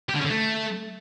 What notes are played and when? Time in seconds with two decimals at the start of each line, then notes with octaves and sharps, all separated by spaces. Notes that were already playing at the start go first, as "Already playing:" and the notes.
0.09 G4
0.14 D3
0.19 C#4
0.25 D3
0.30 A3